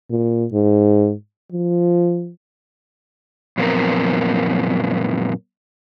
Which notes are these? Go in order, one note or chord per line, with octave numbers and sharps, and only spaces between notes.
A#2
G#2
F3
F#2 A#2 F3 B3 C4 A#4